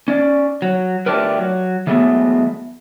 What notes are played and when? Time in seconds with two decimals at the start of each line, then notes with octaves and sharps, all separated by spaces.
0.08 C#4 D5
0.62 F#3
1.06 A3 D4 F4 G4 A#4 B4
1.39 F#3
1.87 E3 F#3 G#3 A3 B3